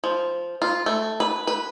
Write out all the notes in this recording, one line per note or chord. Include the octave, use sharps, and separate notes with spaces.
F3
F4
A3
B4
B4